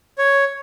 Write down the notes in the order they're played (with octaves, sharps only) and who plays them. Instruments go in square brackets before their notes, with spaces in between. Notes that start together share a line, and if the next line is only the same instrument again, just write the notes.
[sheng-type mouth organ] C#5